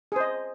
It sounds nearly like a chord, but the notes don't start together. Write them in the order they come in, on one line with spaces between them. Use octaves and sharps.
G#4 C5 D#5